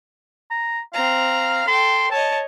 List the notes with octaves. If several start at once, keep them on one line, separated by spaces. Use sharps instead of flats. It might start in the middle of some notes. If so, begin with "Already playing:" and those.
A#5
C4 F5 A#5
A4 G5 C6
C#5 D#5 A5